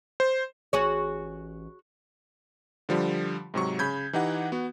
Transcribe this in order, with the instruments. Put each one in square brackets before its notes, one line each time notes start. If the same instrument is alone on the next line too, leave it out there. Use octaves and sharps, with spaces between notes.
[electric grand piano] C5
[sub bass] A1 [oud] F#4 G#4 C#5
[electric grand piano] D3 F3 G3
G#2 C3 F#3 C#6
C#3 B5 G6 G#6
E3 D#4 G4 F#5
B3 F#4